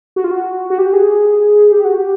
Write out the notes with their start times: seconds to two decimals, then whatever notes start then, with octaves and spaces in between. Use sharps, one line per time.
0.16 F#4
0.24 F4
0.31 F#4
0.70 F#4
0.78 G4
0.93 G#4
1.72 G4
1.85 F#4
1.98 G4